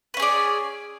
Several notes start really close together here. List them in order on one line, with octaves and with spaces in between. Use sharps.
B4 C#4 G#4 D5